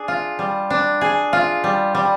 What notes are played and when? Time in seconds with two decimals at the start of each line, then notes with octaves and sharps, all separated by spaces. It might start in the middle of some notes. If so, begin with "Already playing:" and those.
Already playing: D4 G#4
0.08 F4
0.39 G3
0.70 D4
1.01 G#4
1.33 F4
1.64 G3
1.95 G3